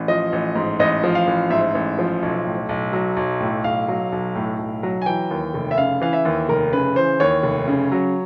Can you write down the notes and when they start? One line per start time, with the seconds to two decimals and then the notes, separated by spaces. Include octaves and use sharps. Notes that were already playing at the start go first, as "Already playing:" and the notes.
Already playing: A1
0.08 F3 D#5
0.32 A1
0.55 G#2
0.79 A1 D#5
1.04 F3
1.15 F5
1.27 A1
1.50 G#2 E5
1.75 A1
1.99 F3
2.22 B1
2.46 A2
2.69 B1
2.93 F#3
3.16 B1
3.40 A2
3.64 B1 F5
3.88 F#3
4.12 B1
4.35 A2
4.59 B1
4.83 F#3
5.02 G#5
5.06 E3 G5
5.30 D#2
5.54 F1
5.71 E5
5.78 C#3 F5
6.01 E3 F5
6.13 E5
6.25 D#2
6.49 F1 A#4
6.72 C#3 B4
6.96 E3 C5
7.20 D#2 C#5
7.43 F1
7.68 C#3
7.92 F#3